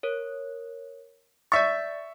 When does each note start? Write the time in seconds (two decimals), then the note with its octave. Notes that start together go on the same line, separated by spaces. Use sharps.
0.03 A#4 C#5
1.52 D5 E5 C#6 A6